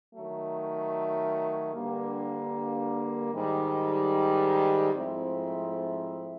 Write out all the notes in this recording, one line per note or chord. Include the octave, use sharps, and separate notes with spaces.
D#3 F#3 A3
G2 D3 G3 A#3
G#2 D#3 G3
G#2 F3 A3 C4 E4